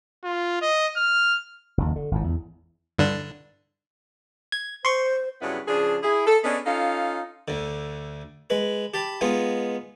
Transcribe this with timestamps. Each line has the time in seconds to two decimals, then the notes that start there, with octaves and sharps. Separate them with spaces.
0.24 F4
0.62 D#5
0.97 F6
1.78 F#1 D#2
1.96 D3
2.11 G#1 A2
2.24 E2
2.98 G2 D3 D4
4.52 G#6
4.85 C5 C6 C#6
5.42 G2 C#3 F#3 B3 D4 E4
5.67 C#3 F3 D4 G#4
6.03 E4 G#4
6.27 A4
6.44 B3 C#4 D4 G#4 D5 D#5
6.66 C#4 D#4 F4 A4 F5
7.48 D2 D3
8.50 G#3 B4
8.94 G4 A5 B5
9.21 G#3 B3 D#4 F4